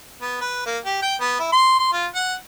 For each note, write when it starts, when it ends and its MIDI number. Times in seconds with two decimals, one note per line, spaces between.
0.21 0.39 59
0.41 0.64 71
0.66 0.78 58
0.85 1.01 67
1.02 1.15 79
1.21 1.38 59
1.39 1.49 64
1.52 1.77 84
1.79 1.90 84
1.93 2.06 65
2.15 2.34 78